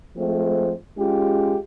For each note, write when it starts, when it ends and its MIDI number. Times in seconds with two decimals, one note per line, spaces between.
0.17 0.72 53
0.17 0.72 56
0.17 0.72 57
0.17 0.72 60
0.98 1.56 56
0.98 1.56 61
0.98 1.56 65
0.98 1.56 67